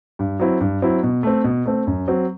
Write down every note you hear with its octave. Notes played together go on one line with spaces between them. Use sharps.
G2
F#3 C4 E4
G2
F#3 C4 E4
B2
A3 C4
B2
A3 C4
F#2
F#3 C4